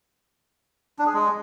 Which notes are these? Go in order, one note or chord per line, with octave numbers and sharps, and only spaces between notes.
D4
G#4
G#3